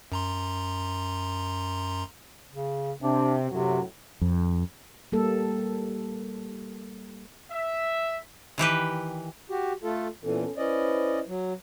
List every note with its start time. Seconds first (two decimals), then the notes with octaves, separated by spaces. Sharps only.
0.12 F#2 A#5 C6
2.52 C#3
3.02 C3 D4
3.50 F#2 A2 C3 F#3
4.21 F2
5.12 G3 A#3 A4
7.51 E5
8.58 D#3 E3 G4 B4
9.50 F#4 G4
9.83 A3 F4 A4
10.23 A#2 E3 B3 C#4 A4
10.57 C#4 E4 B4 C5 D5 D#5
11.28 F#3